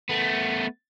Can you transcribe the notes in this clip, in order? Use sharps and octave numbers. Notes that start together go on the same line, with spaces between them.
A3 B3